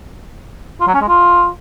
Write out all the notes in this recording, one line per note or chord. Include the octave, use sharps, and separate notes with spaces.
F4
F#3
C#4
G#3
F4